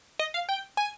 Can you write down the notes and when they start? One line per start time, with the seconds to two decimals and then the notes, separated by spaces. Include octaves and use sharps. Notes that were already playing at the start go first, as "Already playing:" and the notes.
0.19 D#5
0.34 F5
0.49 G5
0.77 G#5